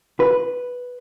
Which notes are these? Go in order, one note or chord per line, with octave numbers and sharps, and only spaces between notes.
B4